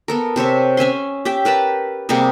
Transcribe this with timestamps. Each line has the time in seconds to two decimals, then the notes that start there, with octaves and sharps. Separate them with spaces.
0.08 B3 A4 A#4
0.36 C3 C5 C#5 E5
0.77 C#4 E5 G#5 C6
1.25 G4 E5 G5
1.45 A#4 B4 A5 B5
2.09 C3 G3 A#3 G#4